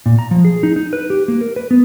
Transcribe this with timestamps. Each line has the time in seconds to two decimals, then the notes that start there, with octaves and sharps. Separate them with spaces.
0.06 A#2
0.19 A#5
0.31 F3
0.45 G#4
0.63 D#4
0.76 D#4
0.93 B4
1.10 G4
1.28 A#3
1.41 A#4
1.56 B4
1.71 B3